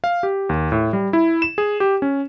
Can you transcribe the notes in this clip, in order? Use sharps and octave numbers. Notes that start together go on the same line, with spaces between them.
F5
G4
D#2
A2
G3
E4
E7
G#4
G4
C#4